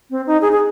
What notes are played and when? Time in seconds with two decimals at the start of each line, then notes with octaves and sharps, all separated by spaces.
0.10 C4
0.27 D#4
0.42 G#4
0.52 G#4